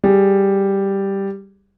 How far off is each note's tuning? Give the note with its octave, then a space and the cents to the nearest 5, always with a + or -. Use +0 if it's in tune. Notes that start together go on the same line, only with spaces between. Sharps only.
G3 +0 G#4 +0